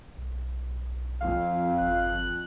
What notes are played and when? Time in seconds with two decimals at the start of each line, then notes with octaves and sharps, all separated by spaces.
0.18 B1
1.21 F2 F5
1.80 G1 F#6